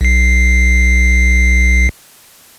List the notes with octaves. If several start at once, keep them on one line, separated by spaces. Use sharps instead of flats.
B1 C7